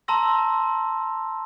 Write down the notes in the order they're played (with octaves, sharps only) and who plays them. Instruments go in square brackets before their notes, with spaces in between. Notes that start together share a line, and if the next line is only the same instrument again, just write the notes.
[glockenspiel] A5 A#5 C6 E6 A#6